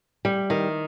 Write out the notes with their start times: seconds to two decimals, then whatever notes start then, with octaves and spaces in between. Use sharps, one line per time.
0.25 G3
0.50 D#3